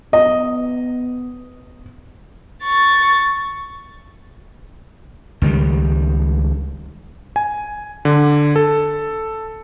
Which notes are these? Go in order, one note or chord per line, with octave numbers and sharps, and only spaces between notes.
B3 D#5
C#6 A6
C#2 D#3 F#3 G3
G#5
D3
A4